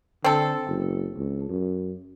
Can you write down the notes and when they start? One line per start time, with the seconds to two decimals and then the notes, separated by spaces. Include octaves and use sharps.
0.24 D3 C4 A4
0.67 F#1
1.17 C#2
1.49 F#2